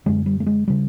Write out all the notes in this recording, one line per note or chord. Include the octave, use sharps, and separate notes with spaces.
F#2 D3 G#3
G3
A3
G#3
C#3 G3